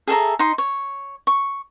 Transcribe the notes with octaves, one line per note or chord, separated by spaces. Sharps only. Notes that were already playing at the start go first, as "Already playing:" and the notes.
G#4 A4 E5 A#5
D#4 C6
C#5
C#6